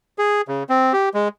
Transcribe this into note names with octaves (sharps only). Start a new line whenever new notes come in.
G#4
C#3
C4
G4
G#3